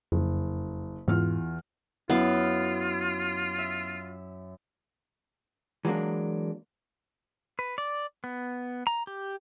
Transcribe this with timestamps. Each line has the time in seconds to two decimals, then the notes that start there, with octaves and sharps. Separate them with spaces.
0.12 F#1 F2
1.08 E2 G#2 F4 F6
2.10 F#2 B3 E4 F4 F5
3.58 E5
5.85 E3 F#3 G#3 A#3 D4
7.59 B4
7.78 D5
8.24 B3
8.87 A#5
9.07 G4